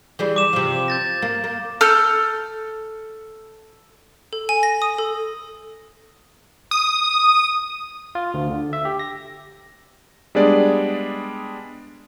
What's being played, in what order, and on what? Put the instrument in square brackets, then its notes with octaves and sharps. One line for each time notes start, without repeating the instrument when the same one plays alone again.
[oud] E3 G3 G#4
[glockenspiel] D6 E7
[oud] C3 F3
[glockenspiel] G6 A6 A#6
[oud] A#3
A#3
[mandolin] A4 F6 G6
[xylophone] A4
G#5
A#6
D#6
A4
[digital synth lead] D#6
[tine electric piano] F4
D2
D3
E5
G4
A#6
[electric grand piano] G3 G#3 B3 D4 G#4 D5